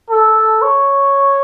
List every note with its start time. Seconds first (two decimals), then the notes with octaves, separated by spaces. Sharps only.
0.10 A4
0.62 C#5